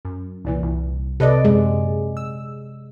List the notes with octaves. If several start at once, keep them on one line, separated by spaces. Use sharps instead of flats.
F#2
C2 A#2 E3
C2
C3 A4 B4 D5 D#5
F#2 A#2 G#3
E6